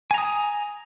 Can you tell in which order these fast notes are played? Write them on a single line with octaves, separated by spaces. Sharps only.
G#5 A#5 D#6